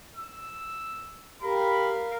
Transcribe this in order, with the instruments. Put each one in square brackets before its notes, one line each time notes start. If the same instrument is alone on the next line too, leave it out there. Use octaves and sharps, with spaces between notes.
[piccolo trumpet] E6
[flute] G4 [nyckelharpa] A#4 F5 [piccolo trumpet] B5